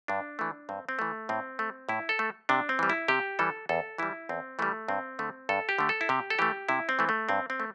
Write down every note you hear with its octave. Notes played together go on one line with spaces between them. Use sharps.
G2 D4
E3 A3
G2 C4
C4
E3 A3
A2 C4
A3
A2 E4
A4
A3
C3 D4
C4
E3 G3
E4
C3 G4
E3 G3 A4
E2 A4
E3 G3 E4
E2 C4
E3 G3 A3
G2 C4
D3 A3
G2 A4
G4
D3 A3
A4
E4
C3 G4
A4
E3 A3 G4
C3 E4
C4
E3 A3
A3
G2 C4
C4
A3